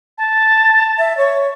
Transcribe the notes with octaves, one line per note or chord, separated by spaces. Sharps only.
A5
E5
C#5